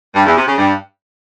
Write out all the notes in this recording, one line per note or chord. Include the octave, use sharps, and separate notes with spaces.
G2
E2
C3
C#3
G2